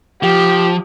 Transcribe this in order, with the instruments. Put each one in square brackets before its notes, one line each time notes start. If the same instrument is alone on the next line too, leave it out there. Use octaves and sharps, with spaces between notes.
[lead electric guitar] F3 [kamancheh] G4